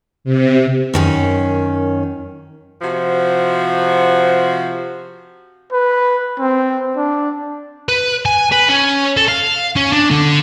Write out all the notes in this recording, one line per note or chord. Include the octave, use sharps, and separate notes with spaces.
C3
F#2 D#3 C#4
C3 F3 F#4
B4
C4
D4
B4
G#5
B4
C#4
A4
F5
C#4
D4
D3